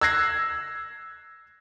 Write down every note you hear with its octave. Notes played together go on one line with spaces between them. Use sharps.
E6 F#6 G#6 A#6 C7